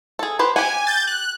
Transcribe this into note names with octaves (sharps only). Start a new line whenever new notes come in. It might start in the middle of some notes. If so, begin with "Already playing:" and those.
G#4 A4
G4 B4 C5
G4 F#5 G#5
G6 A6
F#6